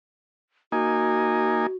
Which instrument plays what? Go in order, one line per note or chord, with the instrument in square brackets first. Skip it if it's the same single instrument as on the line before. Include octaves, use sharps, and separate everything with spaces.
[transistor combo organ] A#3 D#4 G#5 [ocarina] F#4